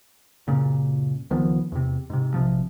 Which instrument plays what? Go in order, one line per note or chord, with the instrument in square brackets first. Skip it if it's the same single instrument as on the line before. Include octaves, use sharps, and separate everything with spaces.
[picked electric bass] F#1 A#2 C#3
C#2 D#3 F3 B3
E2 C3
G#2 C3
A#1 C3 F3